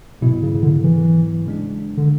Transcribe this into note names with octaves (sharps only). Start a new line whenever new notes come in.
G#2 B2 F#3 B3 E4
C#3
C#3
D3
E3
C#3 G#3 D4
D3